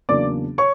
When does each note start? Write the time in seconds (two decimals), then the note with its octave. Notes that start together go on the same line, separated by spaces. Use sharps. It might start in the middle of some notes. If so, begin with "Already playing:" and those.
0.09 E2 C#3 F#3 A#3 D4 D5 D6
0.58 C#5 C#6